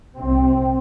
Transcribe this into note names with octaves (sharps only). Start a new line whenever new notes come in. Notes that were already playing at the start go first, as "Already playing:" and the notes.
C2 C3 C4